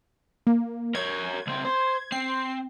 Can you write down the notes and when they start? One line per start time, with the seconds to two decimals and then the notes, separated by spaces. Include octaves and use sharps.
0.47 A#3
0.95 A#4 C#5 G#6
1.47 C#2 C4
1.65 C5
2.12 C4 C7